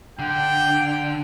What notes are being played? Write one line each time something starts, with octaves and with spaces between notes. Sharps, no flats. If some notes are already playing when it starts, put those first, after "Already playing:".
D3 G5